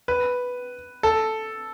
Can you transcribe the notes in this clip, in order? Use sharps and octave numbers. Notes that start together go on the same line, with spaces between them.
B4
A4